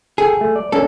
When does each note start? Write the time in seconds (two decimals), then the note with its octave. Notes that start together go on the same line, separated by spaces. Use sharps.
0.18 G#4 A4 G5
0.41 A3
0.56 D5
0.72 A#3 C#4 D4 A4